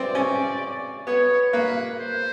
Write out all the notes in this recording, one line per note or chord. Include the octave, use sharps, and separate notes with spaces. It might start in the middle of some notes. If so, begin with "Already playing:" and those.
Already playing: B3 C4 D5
C#4
B3 C#5
A#3 B4
C5